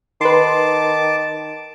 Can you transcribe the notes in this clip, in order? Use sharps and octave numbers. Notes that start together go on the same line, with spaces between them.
D#3 B4 A5 C6 D6